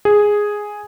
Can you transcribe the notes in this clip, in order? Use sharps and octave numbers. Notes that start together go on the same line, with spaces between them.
G#4